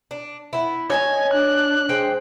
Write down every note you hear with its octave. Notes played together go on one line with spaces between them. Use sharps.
D4
B3 E4
C#5 D#5 G#5 A5
D4 F#6
G#3 C5 G5